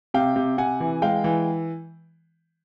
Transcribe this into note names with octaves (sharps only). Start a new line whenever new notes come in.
C3 F5 G5
C3
C3 F#5 G#5
E3
G#3 F5 G5
E3